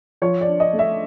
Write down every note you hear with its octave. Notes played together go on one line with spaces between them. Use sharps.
F3 C#5
D5
D4
D#5
A3
E5